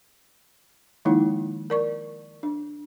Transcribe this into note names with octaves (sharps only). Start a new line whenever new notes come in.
D#3 F3 G#3 A#3 D#4 E4
A#4 D5 C#6
D4